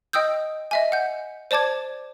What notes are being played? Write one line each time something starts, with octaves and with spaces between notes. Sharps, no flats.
D#5 G5 D#6 E6 G6
D#5 E5 G#5
F#5 G6
C5 D5 A5 D6 G#6